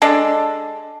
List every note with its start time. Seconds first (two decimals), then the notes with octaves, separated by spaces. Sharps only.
0.02 G#3 D4 A4